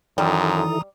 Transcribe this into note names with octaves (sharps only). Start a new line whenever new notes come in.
F#2 D#3 E3 G3 E4 A4 A#5 D#6